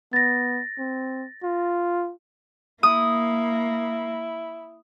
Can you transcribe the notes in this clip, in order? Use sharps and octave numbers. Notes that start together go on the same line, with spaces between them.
B3 A6 A#6
C4
F4
A#3 E4 D#6